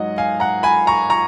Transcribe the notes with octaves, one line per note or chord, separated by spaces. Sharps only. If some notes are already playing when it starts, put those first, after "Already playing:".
Already playing: G#2 F#3 D#5 F#5
F5 G#5
F#5 A#5
G#5 B5
A#5 C#6
A#5 C#6